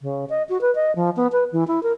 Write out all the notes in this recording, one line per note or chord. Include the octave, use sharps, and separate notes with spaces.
C#3
D#5
F#4
B4
D#5
F3
B3
B4
E3
E4
A#4